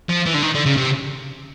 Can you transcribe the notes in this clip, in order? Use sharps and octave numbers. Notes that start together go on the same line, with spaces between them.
F3
E3
D3
D#3
D3
C#3
C3